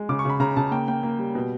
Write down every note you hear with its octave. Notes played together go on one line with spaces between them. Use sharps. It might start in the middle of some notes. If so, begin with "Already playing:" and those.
Already playing: G#3
C#3 D6
C#6
C#3 B5
C#3 A#5
C#3 A5
A#3 G5
A#3 G5
A#3
G3
B2